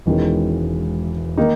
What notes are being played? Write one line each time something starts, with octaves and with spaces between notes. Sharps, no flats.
E1 E2 D#3 G#3 C#4
D#3 A#3 D#4